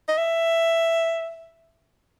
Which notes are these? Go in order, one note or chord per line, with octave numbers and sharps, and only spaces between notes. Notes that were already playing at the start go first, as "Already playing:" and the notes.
D#5
E5